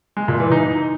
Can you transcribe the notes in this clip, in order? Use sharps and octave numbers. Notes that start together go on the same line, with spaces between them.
G#3
A#2
E3
D#4